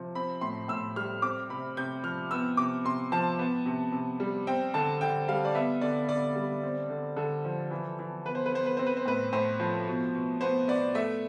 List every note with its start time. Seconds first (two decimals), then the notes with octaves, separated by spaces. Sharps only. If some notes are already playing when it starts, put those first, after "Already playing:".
Already playing: C3 F3
0.15 C4 B5
0.41 A2 C6
0.68 A2 E6
0.96 G3 F6
1.22 C4 D6
1.50 C3 B5
1.77 C3 G6
2.04 F3 F6
2.31 B3 E6
2.57 C3 D6
2.84 C3 C6
3.12 F3 A5
3.39 B3
3.66 C3
3.92 C3
4.20 G3
4.47 C4 G5
4.74 D3 A5
5.01 D3 G5
5.28 G3 F5
5.45 D5
5.54 B3 E5
5.81 D3 D5
6.09 D3 D5
6.35 G3
6.63 C4
6.90 D3
7.17 D3 A4
7.45 F3
7.71 E3
7.99 E3
8.26 B3 B4
8.35 C5
8.46 B4
8.52 B3 C5
8.66 B4
8.77 C4 C5
8.86 B4
8.97 C5
9.06 A2 B4
9.33 A2 C5
9.60 F3
9.87 B2
10.15 B2
10.41 B3 C5
10.68 B3 D5
10.95 A3 E5